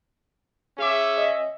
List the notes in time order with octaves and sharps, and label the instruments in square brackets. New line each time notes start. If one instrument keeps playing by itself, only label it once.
[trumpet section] C#4 E5 [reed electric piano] G#4 D6
[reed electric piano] D#5